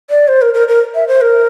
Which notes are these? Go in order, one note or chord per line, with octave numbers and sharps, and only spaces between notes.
D5
C5
A#4
A#4
A#4
E5
C5
A#4